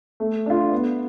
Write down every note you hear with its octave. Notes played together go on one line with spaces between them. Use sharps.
A3
D4 F4
B3